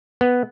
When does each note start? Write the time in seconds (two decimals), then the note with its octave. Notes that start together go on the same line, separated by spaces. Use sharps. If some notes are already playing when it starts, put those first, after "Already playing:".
0.21 B3